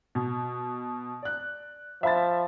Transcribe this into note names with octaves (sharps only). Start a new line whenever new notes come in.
B2
D5 F#6
F3 E5 B5 A6